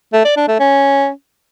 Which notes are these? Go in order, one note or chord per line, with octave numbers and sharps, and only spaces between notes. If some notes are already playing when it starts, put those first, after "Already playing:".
A3
D5
D4
A3
C#4